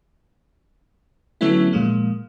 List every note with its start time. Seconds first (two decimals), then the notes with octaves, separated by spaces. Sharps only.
1.41 D3 F#3 A3 B3 C#4 E4
1.73 A#2 F3 G#3 A#3